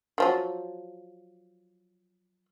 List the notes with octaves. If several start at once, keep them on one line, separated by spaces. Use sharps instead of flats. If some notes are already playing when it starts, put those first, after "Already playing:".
D#3 F3 F#3